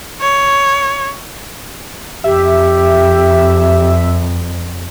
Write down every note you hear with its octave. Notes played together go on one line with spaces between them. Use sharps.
C#5
F2 G4 E5